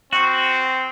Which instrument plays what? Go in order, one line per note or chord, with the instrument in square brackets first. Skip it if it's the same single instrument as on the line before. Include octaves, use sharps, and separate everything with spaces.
[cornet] C4 [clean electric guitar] F#4